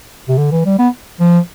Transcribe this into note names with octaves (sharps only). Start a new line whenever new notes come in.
C3
D3
E3
G3
B3
F3